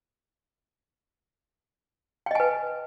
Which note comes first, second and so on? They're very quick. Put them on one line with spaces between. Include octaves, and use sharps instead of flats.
G5 D#5 G#5 B4